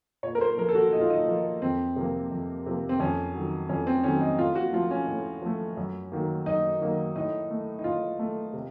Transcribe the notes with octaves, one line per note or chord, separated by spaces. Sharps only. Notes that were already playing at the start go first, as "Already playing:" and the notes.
A#2 C#5
A#4
C5
F3 A#3 A#4
A4
F#4
A#2 D#4
F4
D#4
F3 A#3
F2 C4
C3 F3 A#3
F2
C3 F3 A#3
C4
F2 C#4
D#3 F#3
F2 C#4
C4
D#3 F#3 C#4
D#4
A2 F4
F#4
F3 A3 F4
C#4
A2
F3 A3
F#2
D#3 F#3 A#3
F#2 D#4
D#3 F#3 A#3
A2 D#4
A3
D#4
A2 F4
A3
C3